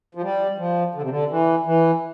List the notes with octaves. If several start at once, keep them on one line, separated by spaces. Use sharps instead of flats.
F3
G3
F3
D3
C3
D3
E3
E3